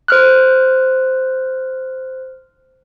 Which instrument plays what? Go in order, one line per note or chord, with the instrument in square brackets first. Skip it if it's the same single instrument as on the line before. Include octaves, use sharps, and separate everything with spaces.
[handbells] C5 F6 F#6